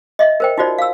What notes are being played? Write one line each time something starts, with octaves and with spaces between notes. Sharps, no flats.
D#5 E5
A#4 C5 G5
D#4 F4 F#4 C5 D5
F5 E6